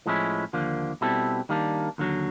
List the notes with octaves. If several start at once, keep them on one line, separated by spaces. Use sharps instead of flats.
A2 F3 G#3 C#4 E4
D#2 D3 F3 A#3
B2 G3 C4 E4 A4
D#3 G3 A#3 D4
D#2 D3 F#3